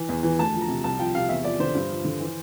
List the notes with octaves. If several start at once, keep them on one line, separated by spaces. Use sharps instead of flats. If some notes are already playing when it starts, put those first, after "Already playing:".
Already playing: E3
E2
E3
D2 A5
F3
A#5
C3
C2 A5
F3 G5
C3 F5
E2 E5
F3 D5
D3 C5
G2
F3
D3
E3